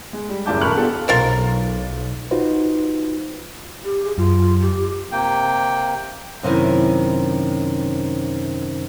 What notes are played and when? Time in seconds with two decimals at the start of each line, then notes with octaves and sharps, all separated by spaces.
0.13 G#3
0.29 G3
0.46 F#1 A2 D5 A5 D6 G6
0.61 D#1 A#4 B5 C#6 F6 F#6
0.75 B3 D4 F4 G4 A4
1.08 B1 F4 A#4 C5
2.31 D#4 F4 F#4 B4 C5
3.84 G4
4.05 G#4
4.18 F#2 F4
4.61 G4
5.12 C3 A#3 G5
6.43 F#2 C3 D#3 C#4 E4